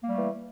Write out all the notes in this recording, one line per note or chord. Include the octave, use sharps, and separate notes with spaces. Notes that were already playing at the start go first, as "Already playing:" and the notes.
E3 G3 A3 A#3